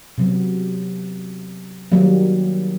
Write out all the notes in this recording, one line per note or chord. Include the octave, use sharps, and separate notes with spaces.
C3 F#3 B3
D#3 F#3 G3 A#3